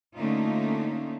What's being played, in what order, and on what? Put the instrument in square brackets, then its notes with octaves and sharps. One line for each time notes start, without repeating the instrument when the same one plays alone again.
[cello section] D3 A3 A#3 C#4 D#4 F4